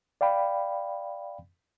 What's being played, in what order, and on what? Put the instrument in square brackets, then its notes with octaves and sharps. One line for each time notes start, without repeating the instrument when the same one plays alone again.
[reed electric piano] D5 F5 G5 B5